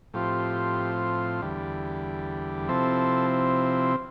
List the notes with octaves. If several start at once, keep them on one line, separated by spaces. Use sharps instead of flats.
A2 F3 C4 F4 G4
E2 D3 G3
C3 F3 C4 E4 A4